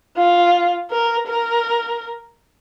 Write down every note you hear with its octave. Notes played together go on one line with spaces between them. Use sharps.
F4
A#4
A#4